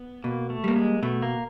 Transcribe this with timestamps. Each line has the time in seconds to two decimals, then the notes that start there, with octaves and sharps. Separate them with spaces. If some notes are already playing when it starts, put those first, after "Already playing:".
Already playing: B3
0.24 B2 A#3
0.50 A3
0.64 G3 A#3
0.76 G#3
1.03 B2 A3
1.22 A#3